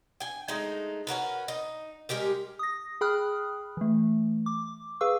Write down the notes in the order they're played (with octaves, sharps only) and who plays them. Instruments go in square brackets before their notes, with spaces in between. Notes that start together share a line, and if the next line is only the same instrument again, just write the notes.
[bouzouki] G5 G#5
G#3 A3 D#4
C#4 F#4 A#4 B4
D#4
G3 G#3 G4 A#4
[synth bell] D#6 A#6
G#4 G5 B5 D#6 F6 F#6
E3 A3
D6
G#4 B4 F5 C#6 E6